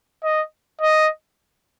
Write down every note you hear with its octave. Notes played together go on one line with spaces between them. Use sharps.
D#5
D#5